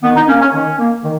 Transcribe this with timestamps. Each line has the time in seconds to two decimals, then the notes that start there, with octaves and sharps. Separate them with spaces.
0.03 D#3 B3
0.15 D#4
0.28 A#3 C#4
0.40 C#4
0.53 D#3 C#4
0.78 A#3
1.04 D#3